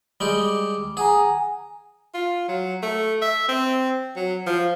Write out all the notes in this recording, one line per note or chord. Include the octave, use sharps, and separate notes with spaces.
G3 G#3 G4
D6
G#4 F#5 G#5 A#5
F4
F#3
A3
E5
C4
F#3
F3